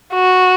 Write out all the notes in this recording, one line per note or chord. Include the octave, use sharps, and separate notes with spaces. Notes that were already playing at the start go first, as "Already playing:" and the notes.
F#4